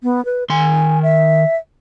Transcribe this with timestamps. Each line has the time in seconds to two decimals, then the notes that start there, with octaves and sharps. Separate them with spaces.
0.03 B3
0.25 B4
0.50 D#3 G#5 C6
1.03 E5